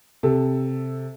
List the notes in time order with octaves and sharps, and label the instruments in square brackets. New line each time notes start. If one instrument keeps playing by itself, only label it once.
[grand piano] C3 A4